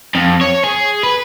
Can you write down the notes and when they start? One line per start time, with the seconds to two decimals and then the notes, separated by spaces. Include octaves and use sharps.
0.15 F2
0.41 C#5
0.64 G#4
1.03 B4